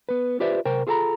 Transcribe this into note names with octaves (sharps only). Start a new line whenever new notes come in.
B3 B4
F4 G4 B4 C5 D5 E5
C3 A#4 C5 G5
F4 G#4 A4 G#5 A#5 B5